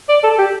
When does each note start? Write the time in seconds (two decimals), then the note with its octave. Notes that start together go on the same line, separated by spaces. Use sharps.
0.09 D5
0.23 A4
0.38 G4